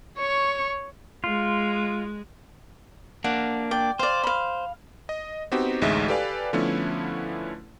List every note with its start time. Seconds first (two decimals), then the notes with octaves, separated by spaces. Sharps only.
0.18 C#5 C#6
1.24 G#3 F4
3.24 A#3 D4 F#5
3.71 D5 G5
3.99 C5 D5 F5
4.24 F5 B5
5.09 D#5
5.52 B3 C4 D#4 F#4 G4
5.81 A1 D2 G#3 D#4 E5 B6
6.08 G4 A4 B4 D5 F5 G#5
6.53 D3 F3 A3 B3 C#4 E4